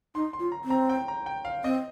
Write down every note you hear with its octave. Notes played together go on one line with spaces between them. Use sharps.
D#4 C6
C6
F4
A#5
C4
A#5
G5
A#5
G5
F5
C4 D#5